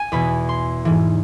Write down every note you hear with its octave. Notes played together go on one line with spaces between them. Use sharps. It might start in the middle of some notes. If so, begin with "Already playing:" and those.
Already playing: G#5
E2 B2 B5
C6
G#2 E3